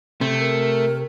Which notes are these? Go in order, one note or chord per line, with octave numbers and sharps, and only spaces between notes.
C3 A3
A#4